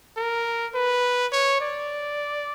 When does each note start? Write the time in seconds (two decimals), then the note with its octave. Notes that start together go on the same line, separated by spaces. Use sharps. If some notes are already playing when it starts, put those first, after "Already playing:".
0.17 A#4
0.74 B4
1.33 C#5
1.61 D5